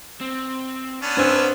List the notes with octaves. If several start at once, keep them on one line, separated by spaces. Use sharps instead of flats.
C4
B3 C#4 D4
G2 C4 F#5 G#5 E6